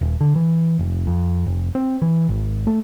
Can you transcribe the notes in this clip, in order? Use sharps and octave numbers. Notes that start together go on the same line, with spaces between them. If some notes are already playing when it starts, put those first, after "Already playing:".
D#1
D3
E3
F1
F2
F1
C4
E3
G#1
A3